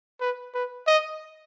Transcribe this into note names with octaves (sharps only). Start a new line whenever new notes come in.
B4
B4
D#5